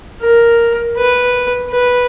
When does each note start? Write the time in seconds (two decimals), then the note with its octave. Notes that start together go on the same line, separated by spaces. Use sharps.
0.22 A#4
0.97 B4
1.71 B4